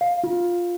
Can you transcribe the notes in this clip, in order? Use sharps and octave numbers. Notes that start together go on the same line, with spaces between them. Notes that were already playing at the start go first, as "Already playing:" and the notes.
F5
F4